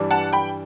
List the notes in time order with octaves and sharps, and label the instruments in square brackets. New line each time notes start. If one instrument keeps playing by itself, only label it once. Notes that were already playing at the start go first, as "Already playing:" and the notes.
Already playing: [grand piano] G2 E3 G3 D4 G4
[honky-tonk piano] F#5 A5
G5 B5